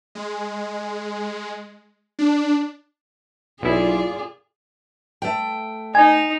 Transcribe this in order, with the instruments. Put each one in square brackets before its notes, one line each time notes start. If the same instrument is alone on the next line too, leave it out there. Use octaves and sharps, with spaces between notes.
[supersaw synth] G#3
D4
[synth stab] B1 E4 [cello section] F4 D5 [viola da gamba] G#4
[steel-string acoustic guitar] A3 G5
[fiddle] D#4 [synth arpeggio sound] G#5